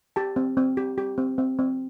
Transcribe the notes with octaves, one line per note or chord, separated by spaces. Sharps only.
G4 A5
C4
C4
G4
G4
C4
C4
C4